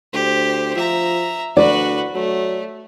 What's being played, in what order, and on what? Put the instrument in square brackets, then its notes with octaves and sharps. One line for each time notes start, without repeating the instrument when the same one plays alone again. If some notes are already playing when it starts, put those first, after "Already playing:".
[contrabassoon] D2 [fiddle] G4 C5
[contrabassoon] F3 [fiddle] E5 A#5
[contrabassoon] D2 [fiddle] F#4 B4 [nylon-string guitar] D5
[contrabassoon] F#3 [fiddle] A3